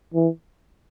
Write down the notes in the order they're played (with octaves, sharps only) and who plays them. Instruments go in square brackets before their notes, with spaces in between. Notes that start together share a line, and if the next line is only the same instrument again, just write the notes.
[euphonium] E3